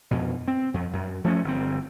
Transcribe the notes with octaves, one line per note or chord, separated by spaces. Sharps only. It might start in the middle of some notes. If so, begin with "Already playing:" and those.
F2 B2
C4
F2
F#2
F3 A3 A#3 C#4
G1 C4